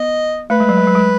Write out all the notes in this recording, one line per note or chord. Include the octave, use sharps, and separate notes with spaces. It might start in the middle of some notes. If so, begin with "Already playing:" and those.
Already playing: B3 D#5
A3 B4
G#3
F#3
G#3
F#3
G#3